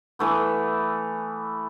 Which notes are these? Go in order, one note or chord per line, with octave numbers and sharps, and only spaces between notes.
E3 A3 B3